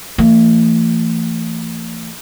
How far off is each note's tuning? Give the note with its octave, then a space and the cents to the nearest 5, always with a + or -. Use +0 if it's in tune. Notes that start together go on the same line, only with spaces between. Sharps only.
E3 +30 A3 +45